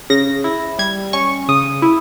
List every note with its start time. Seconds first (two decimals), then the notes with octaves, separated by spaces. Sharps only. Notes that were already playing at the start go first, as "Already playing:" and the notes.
0.10 C#3 A#6
0.44 E4
0.79 G3 G#6
1.13 C#4 C#6
1.48 C#3 D#6
1.82 E4